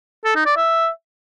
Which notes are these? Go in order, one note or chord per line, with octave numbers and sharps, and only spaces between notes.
A4
D#4
D5
E5